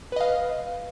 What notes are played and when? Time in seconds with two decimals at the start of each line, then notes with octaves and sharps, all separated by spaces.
0.12 B4
0.16 D#5
0.21 F5